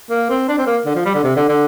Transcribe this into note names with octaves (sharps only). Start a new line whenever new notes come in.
A#3
C4
D4
C4
A#3
D3
F3
G3
D3
C3
D3
D3